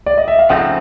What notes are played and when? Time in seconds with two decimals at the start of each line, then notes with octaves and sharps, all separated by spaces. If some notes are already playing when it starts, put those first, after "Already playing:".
0.06 D5
0.18 D#5
0.28 E5
0.39 F5
0.49 C#3 F3 A3 C4 D#4 F#5